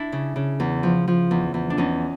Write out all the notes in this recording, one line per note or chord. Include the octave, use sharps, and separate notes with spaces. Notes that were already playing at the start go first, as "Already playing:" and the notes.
Already playing: D4 E4
C#3
C#3
E2
F3
F3
E2
E2
D4
E2 C#4 D#4